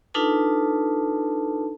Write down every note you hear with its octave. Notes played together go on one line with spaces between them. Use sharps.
D4 D#4 F4 A4 B4 A5